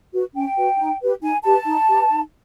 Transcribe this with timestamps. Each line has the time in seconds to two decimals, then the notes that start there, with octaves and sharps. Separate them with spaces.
0.13 F#4 B4
0.34 C#4 G5
0.57 F#4 B4
0.78 D#4
1.01 G4 B4
1.22 D#4 G#5
1.44 G4 B4 A5
1.66 D#4
1.88 G4 B4
2.10 D#4